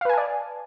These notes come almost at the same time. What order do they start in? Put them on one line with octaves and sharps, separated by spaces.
F5 B4 G#5 A5 D5